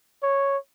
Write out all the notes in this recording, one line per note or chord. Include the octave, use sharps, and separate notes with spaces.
C#5